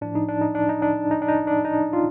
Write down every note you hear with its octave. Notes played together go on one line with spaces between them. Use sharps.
A2 F3 D4
D#4
D4
D#4
D4
D#4
D4
D#4
D4
D#4
D4
D#4
F4